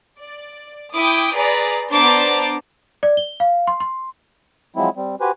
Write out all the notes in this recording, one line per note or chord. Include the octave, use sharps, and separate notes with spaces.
D5
E4 G5 D6 D#6
G#4 B4 D5 A#5
B3 D4 C5 A5 A#5 D6
D5
G7
F5
C6
C6
F3 F#3 G#3 C4 E4
G3 C4
F#4 G4 B4 C5 G#5